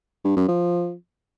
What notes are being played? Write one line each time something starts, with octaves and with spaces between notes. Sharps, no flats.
G2
F#2
F3